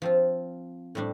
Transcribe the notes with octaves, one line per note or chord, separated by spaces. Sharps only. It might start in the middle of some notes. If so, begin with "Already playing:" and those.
F3 C4 F4
A2 G3 D4